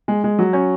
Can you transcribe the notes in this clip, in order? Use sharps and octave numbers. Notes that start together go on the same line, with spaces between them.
G#3
G#3
F#3
C#4